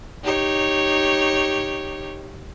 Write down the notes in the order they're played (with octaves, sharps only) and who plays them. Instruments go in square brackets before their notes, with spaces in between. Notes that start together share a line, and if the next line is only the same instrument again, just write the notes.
[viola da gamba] D#4 G4 C#5